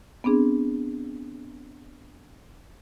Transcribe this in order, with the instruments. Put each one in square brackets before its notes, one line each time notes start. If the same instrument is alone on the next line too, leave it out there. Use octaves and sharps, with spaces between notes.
[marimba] B3 C4 D4 G#4